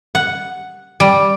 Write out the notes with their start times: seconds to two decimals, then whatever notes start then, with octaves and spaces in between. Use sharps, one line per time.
0.15 F#5
1.00 G3